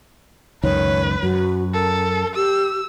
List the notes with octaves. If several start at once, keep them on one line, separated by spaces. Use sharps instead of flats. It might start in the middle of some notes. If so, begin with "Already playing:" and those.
C#2 F#2 D#3 B4 C#5
F#2 F#4
A4 A#4
G4 E6